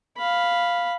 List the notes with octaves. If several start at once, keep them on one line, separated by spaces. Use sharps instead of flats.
F5 B5